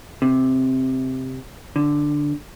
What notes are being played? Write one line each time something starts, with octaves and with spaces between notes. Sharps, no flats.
C3
D3